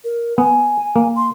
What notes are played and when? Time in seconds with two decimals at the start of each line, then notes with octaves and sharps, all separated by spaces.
0.04 A#4
0.38 B3 G#5
0.96 A#3
1.16 C6